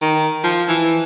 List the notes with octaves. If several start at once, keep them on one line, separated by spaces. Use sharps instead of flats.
D#3
F3
E3